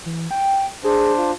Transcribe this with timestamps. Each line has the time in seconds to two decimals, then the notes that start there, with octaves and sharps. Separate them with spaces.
0.06 E3
0.31 G5
0.84 D4 G#4 C5
1.18 F4